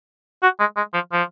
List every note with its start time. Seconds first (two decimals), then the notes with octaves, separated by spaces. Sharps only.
0.43 F#4
0.60 G#3
0.76 G#3
0.94 F3
1.12 F3